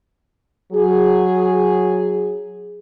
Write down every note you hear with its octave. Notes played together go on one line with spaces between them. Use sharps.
F#3 G#4